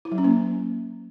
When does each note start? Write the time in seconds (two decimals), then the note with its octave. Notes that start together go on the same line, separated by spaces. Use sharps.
0.05 E4
0.12 F#3
0.18 C#4
0.24 A#3